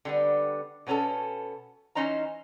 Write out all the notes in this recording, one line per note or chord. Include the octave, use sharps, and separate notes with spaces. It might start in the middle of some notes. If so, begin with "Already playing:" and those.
D3 G3 B3
B2 B3 C#4 G#4 A4
E3 C#4 D#4 C5 A#5